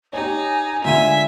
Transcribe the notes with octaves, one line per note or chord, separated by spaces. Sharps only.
D#4 G4 C#5 G#5
C#2 D3 E5 G#5 D#7